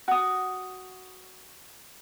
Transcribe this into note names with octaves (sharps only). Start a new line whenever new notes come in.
F#4 D#6